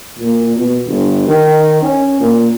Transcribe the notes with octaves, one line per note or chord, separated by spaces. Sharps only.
A#2
B2
G1
D#3
C#4
A#2